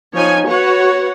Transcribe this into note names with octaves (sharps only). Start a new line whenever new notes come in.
F3 D#4 C#5 G#5
F#4 B4 C#5 F#5